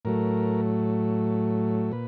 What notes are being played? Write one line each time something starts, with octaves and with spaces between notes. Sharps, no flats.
A2 F#3 A3 A#4
A#2 B4